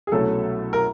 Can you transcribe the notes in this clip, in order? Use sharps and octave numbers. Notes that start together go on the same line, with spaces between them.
G#4
C2 B2 F#3 A3 C#4 A4
A#4